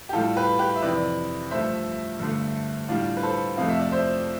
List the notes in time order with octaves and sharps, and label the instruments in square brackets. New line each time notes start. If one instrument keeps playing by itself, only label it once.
[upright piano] G4
A2 G3 F4 A4
G4 B4
G4 B4
E5
F2 C3 E3 B4 D5
G2 F3 A3 C5 E5
G2 D3 A3
A2 G3 D4 F4
B4
A4 C5
F2 C3 F3 A3 F5
E5
D5
C5 E5